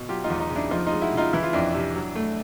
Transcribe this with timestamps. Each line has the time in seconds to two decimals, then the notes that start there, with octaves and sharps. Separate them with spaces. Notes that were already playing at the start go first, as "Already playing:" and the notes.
Already playing: B2
0.09 F#3 F4 G4
0.24 D#4 F4
0.30 E2
0.40 D#4
0.50 C#3
0.56 D4 E4
0.71 F3 D#4 F4
0.86 D#4 F4
0.92 G#3
1.02 E4 F#4
1.13 C#3 D#4 F4
1.33 E3 E4
1.43 F4
1.53 F2 D4 E4
1.74 C3
1.95 F#3
2.15 A3